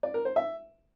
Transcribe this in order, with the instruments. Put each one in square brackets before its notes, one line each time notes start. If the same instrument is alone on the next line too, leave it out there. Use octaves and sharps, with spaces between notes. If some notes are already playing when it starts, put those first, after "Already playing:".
[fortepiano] D5
A#4
C5
E5